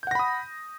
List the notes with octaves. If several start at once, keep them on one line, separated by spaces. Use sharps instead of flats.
F#5 B5 D#6 G6 A#6